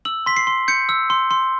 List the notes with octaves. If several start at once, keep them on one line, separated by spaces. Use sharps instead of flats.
E6 F#7
C6 B6
C7
C6
G6 C#7
E6
C6
C6